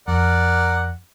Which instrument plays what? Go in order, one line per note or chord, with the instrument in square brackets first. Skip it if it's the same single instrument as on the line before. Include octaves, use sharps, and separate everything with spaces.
[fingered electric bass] F2 [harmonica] A#4 D5 F#5